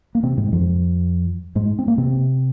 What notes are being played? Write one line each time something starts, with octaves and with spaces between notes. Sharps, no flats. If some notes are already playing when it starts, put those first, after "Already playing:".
A#3
C3 C4
G#2 G#3
F2 F3
G#2 G#3
C4
A#3
C3 C4